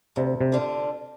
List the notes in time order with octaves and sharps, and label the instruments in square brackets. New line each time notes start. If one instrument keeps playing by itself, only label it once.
[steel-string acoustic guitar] D2 [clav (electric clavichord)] C3
[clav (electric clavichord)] C3
[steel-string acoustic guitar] D3 G3 D4 F4